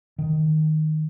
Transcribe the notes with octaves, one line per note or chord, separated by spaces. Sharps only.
D#3